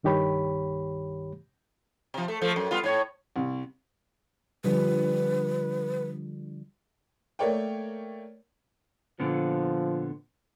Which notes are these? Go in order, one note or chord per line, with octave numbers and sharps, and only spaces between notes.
C2 G2 D#3 G4 C#5 B5
C3 F3
A3
F3 A3
F#2
G3 B3 F4
A2 C#5
C2
D3 F3 G3 B4
A3 A#3 A#4 C#5 D5 G5
A#2 D3 F3 B3